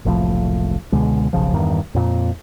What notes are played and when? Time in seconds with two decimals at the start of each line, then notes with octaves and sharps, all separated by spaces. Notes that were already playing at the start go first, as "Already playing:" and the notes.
0.05 F#1 C2 A2 F3
0.92 C#2 B2 D3 G#3
1.33 F1 B1 C#3 F3
1.54 E2 G2 D#3
1.95 F2 A#2